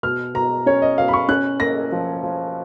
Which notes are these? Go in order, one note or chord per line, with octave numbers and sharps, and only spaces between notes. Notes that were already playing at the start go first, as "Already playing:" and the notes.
B2 F6
B2 A#5
C#4 C#5
D#5
B2 F5
B5
C#6
C#4 F#6
A#3 A#6
F3
F3